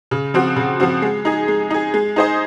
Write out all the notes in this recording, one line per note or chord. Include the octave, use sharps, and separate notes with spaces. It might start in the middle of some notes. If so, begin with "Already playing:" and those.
C#3
F3 C4 F#4
C#3
F3 C4 F#4
G#3
D#4 G#4
G#3
D#4 G#4
G#3
D#4 G#4 C5 D#5